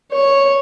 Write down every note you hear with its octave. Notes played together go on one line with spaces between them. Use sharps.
C#5